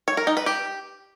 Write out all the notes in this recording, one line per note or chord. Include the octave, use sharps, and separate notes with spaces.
C#5
A#4
D#4
B4
G4